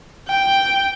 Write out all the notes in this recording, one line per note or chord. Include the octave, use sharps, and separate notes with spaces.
G5